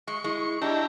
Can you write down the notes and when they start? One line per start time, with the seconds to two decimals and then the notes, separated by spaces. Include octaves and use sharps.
0.08 G#3 C#6
0.24 G#3 E4
0.62 D4 E4 G4 D#5 A#5